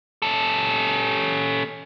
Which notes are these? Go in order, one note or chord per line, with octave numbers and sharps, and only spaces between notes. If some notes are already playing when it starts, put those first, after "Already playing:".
C#4 A4